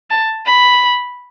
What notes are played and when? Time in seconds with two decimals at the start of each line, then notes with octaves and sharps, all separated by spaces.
0.10 A5
0.46 B5